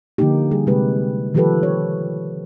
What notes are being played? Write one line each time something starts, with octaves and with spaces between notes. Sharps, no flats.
D3 F3 A#3 D#4 G4
G3 G#4
C3 G#3 G4 B4
D#3 F3 F4 G4 A4 B4
C#5